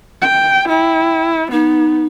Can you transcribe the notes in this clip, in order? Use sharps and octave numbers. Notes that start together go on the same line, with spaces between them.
G5
E4 G5
B3 D#4